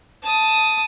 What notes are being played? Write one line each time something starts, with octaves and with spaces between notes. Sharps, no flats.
A5 D#6